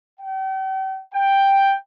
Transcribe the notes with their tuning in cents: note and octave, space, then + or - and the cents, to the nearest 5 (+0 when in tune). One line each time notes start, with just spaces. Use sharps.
G5 -40
G5 +5